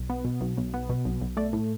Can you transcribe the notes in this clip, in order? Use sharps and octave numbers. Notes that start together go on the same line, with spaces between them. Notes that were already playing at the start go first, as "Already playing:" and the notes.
Already playing: B1
B3
B2
B1
B1
B3
B2
B1
B1
A3 D5
A2